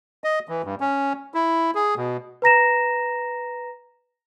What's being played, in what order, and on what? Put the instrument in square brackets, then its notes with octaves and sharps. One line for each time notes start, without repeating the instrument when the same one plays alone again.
[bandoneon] D#5
E3
G2
C#4
E4
G#4
B2
[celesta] B4 A#5 A#6 E7